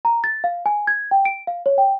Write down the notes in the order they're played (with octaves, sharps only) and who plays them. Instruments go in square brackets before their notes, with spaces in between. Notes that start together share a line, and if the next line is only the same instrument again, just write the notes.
[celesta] A#5
A6
F5
G#5
G#6
G5
D7
F5
C#5
G5